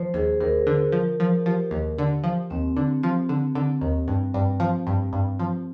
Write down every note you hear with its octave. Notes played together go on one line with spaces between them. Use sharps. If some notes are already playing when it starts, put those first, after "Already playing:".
Already playing: F3 C5
D#2 G#4
D#2 A#4
D3
F3
F3
F3 G4
D#2
D3
F3
D#2 C4
D3
F3
D3
D3
D#2
G2
G2
F3
G2
G2
F3